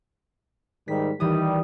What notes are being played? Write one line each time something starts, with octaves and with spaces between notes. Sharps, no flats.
G#2 D#3 G3 B6
D#3 E3 G3 D#6